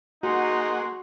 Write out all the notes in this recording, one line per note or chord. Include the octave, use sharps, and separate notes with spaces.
A#3 D#4 F#4 G#4 F#5 C6